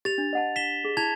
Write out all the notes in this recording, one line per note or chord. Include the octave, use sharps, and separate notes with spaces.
G4 A6 F7
D4
D#5 F#5 A5
B6 E7 G7
G#4
E4 A5 G#6 F7